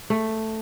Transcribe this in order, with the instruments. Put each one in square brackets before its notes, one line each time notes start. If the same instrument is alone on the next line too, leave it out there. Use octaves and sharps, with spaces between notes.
[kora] A3